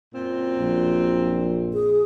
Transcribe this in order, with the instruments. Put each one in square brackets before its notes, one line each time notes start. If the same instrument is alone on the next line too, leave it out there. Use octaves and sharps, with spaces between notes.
[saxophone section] F#2 A#2 C4
[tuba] A#1
[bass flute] G#4